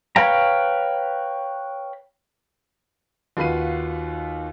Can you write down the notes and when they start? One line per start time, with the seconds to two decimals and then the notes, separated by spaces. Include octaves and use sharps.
0.16 B4 C#5 F5 G5 A#5
3.37 D#2 F4 F#4 B4 C7 D#7